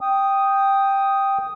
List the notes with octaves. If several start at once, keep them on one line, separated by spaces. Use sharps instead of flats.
G5 D#6